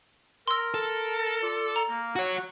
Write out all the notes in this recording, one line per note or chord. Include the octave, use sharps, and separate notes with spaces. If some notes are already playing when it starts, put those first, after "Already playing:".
A#4 C6 E6
A4
F4 D5
A#5
A#3
F#4 C#5 F#5